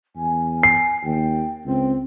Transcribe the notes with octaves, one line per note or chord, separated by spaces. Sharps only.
E2 G#5
C7
D#2 G5
C#2 C4 G5